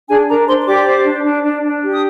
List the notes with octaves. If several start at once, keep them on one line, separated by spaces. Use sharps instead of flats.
D4 G#4 G#5
D4 A#4 A#5
D4 C5 C6
C6
G4 D5 D6
C5
D4
D4
D4
D4
G4
D#6